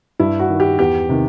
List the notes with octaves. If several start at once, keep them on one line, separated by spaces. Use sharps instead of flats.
G2 E4
F#4
D#3
G4
E2 G4
C3 D#3